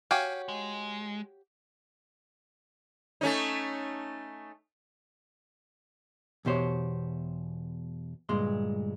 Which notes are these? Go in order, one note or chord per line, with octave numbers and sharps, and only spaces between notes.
F#4 G4 C#5 F5 G5 G#5
G#3
A3 C#4 D#4
E2 B2 G4 C5 C#5
D2 G2 A#2 G#3 C6